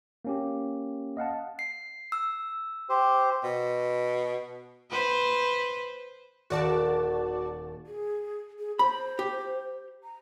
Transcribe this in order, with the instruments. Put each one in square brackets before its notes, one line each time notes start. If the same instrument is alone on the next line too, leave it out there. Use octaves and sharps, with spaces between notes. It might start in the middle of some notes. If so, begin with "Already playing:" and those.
[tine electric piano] A#3 C#4 G4
D#5 F5 F#5 A5
[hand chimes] C7
E6
[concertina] G4 C5
[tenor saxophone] B2
[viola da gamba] B4 C5
[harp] D#1 [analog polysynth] F#4 D5 A5
[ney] G#4
G#4
[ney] C5 [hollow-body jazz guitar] B5
[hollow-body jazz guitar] G4
[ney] A#5